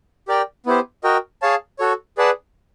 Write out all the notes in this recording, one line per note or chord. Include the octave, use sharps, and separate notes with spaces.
G4 A#4 D5 G5
B3 E4 G4 C5
F#4 A#4 D#5 G5
G#4 C#5 F5 A5
F#4 A4 C#5
G#4 B4 D5 F#5 A5